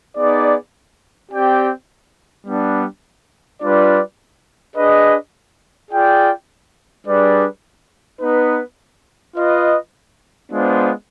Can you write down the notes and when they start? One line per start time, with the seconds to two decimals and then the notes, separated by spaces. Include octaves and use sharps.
0.16 B3 D#4 G#4 D5
1.31 C4 G4 D5 G5
2.46 G3 B3 D4
3.62 G3 D4 F4 B4 D5
4.76 D4 G#4 B4 D#5
5.91 F4 G#4 D5 G5
7.06 G3 D4 G#4 B4 D5
8.21 B3 D#4 B4
9.36 F4 B4 D#5
10.52 G#3 B3 D4 F4 C5